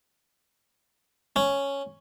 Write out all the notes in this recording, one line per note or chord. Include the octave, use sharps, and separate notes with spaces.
C#4